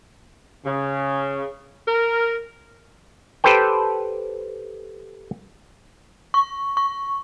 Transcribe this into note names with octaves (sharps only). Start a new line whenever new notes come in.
C#3
A#4
G4 A4 B4 C5 G5
C#6
C#6